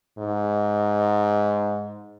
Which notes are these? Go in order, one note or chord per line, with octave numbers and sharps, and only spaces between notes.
G#2